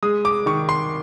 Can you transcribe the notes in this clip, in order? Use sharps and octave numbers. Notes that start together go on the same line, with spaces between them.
G#3 D#6
D6
D#3 C#6
C6